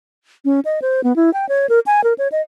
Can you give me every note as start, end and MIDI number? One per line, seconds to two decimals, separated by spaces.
0.45 0.60 61
0.65 0.79 75
0.82 1.03 72
1.04 1.15 59
1.16 1.33 64
1.33 1.48 79
1.49 1.67 73
1.69 1.80 70
1.86 2.03 80
2.04 2.13 70
2.18 2.28 73
2.32 2.41 75